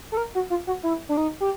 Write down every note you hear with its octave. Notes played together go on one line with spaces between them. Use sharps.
A4
A#4
F#4
F4
F#4
E4
D4
D#4
G4